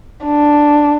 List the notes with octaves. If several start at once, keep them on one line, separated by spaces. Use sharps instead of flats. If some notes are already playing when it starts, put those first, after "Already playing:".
D4